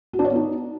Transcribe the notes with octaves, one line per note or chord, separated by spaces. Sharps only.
F#4
D4
C#5
B3
D#4